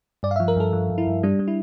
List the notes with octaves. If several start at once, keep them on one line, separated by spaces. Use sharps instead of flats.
G2 D5
F5
E5
F3
A#4
G2 A4
F3
G2
E4
G2
G3 D4
G3
E4